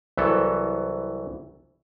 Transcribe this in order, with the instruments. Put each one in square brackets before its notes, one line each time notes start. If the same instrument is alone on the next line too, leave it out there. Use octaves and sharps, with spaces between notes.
[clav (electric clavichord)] C2 E3 F#3 B3 A4